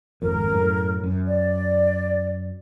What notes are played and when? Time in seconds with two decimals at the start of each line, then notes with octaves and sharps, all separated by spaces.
0.22 G#1 F2 A#4
0.52 F#2 A2
1.03 F#2
1.27 D5